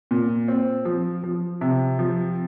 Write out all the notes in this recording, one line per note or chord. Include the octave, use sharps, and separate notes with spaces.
A#2
C4
F3
F3
C3
F3